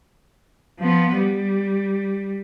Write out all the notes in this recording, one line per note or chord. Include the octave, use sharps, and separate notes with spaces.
F3 B3
G3